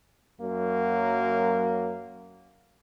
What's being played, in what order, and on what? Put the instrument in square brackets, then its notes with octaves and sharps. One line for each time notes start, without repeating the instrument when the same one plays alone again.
[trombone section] F#2 F#3 A#3